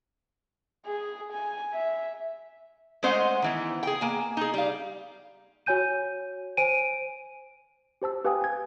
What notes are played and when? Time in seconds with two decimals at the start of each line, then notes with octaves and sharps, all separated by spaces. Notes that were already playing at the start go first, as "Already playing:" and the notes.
0.86 G#4
1.33 G#5
1.74 E5
3.03 G#3 A3 C#4 C5 D#5 F#5
3.42 D#3 E3 B3
3.83 G#4 G5
4.01 A#3 G#5
4.37 D#4 G#4
4.54 G3 F5
5.66 F#4 C#5 G#5 G6 D#7
6.57 C5 G#5 D7 D#7
8.02 G4 C5 A5 E6
8.24 G4 B4 F5 G5 G#5 D#6
8.41 G#5 G#6